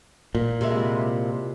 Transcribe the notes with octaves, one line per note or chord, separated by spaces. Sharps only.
A#2
C3 G#3 E4